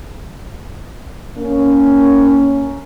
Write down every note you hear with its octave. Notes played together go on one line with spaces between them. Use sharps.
A#3 C#4